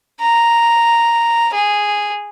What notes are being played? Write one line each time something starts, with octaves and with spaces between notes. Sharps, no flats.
A#5
G#4